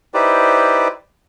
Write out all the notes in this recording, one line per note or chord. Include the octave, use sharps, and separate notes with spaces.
D#4 E4 G4 B4 C5 D5